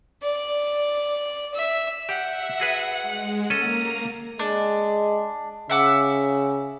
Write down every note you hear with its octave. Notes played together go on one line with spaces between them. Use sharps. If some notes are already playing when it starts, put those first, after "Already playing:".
D5
E5
G4 E5 F#5
F#4 G#4 B4
G#3
A#3 C#4 A4 A#5 D#7
G#3 D4
C#3 E5 F#5 D6